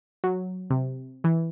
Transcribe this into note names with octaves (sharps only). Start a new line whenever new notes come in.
F#3
C3
E3